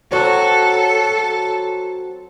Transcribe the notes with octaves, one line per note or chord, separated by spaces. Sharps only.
F#3 C4 F#4 A4